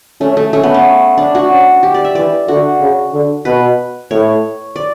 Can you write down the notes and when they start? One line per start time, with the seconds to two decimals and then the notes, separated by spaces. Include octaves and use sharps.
0.21 A3 C#4
0.37 A3
0.53 A3 C#4
0.63 B3
0.74 C#4
1.18 D4
1.35 F#4
1.50 C#4
1.83 G4
1.94 D5
2.05 E5
2.15 E3 D5
2.48 D3 F#4
2.80 C#3
3.13 D3
3.45 B2 B4
4.11 A2 C#5
4.76 D5